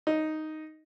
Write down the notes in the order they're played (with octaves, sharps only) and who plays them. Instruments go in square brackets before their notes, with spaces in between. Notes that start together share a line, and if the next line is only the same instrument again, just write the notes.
[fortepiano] D#4